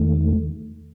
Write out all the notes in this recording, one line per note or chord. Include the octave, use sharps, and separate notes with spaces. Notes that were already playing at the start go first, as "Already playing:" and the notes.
Already playing: E2 D#3 A3